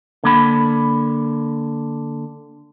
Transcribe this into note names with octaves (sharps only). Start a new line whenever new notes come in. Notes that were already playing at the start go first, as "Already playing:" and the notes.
D3 A#3 B5